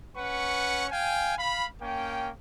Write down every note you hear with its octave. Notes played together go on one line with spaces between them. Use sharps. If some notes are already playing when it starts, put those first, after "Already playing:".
C#4 B4 F#5 C#6
F5 G5 G#5
F5 B5
A#3 C#4 G5